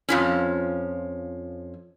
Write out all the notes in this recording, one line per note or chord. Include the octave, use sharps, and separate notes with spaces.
F2 F3 C#4